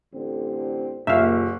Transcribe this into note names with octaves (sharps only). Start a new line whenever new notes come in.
A1 D3 C4
F#1 D#2 A#2 E5 F5